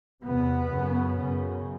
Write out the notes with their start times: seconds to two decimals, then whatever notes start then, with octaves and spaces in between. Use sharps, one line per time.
0.23 E2 C3 B3
0.72 F#2 C#3
1.18 F#2 C#3